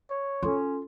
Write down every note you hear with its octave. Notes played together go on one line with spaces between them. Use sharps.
C#5
C#4 F4 A4 C6